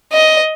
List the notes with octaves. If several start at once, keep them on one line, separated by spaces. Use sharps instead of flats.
D#5